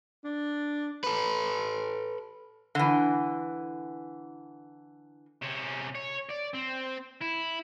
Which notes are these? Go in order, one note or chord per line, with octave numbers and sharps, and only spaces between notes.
D4
A4 B4
D3 E3
C3 C#4
C#5
D5
C4
E4